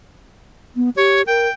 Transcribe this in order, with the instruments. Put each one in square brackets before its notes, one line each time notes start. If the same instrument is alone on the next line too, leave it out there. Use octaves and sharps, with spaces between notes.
[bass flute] B3
[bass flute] G4 [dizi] C#5
[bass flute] A#4 [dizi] G5